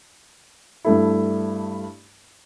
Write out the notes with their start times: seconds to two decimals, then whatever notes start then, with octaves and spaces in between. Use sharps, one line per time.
0.85 G2 A3 E4